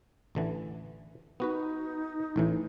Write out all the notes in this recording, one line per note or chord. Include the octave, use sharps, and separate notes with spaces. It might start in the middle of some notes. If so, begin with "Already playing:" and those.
A1 D3 E3
B3 D#4 F#4 B4
A1 A2 E3